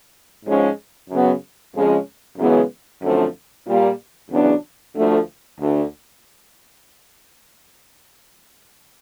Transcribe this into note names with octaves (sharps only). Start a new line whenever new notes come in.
G#2 F3 G#3 C#4
F#2 C#3 F#3 B3
F2 C#3 F3 G#3 C#4
F#2 C#3 E3 G#3 B3
F#2 D3 F3 A3 C4
A#2 G3 A#3
E2 C#3 F#3 B3 D4
D2 D3 F3 A3
D2 D3